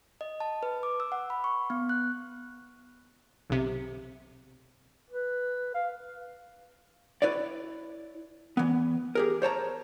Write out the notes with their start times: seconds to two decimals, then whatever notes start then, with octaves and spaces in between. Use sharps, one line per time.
0.21 D#5
0.40 A5
0.63 B4
0.83 D6
1.00 E6
1.12 F#5
1.30 B5
1.44 C#6
1.70 B3
1.89 F#6
3.50 B1 C3
5.10 B4
5.74 F5
7.22 E4 B4 C#5 D5
8.57 E3 B3
9.15 G4 G#4 A#4
9.42 C5 C#5 A5 A#5